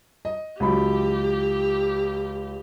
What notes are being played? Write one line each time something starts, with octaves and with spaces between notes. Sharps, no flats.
D#5
C#2 F#3 G4 B5